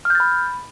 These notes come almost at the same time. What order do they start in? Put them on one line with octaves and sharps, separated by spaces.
F6 G6 A6 B5